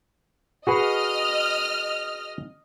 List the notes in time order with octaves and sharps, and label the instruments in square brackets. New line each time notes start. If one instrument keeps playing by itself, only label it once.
[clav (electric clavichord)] F#4 G#4 B4 [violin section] D#5 F6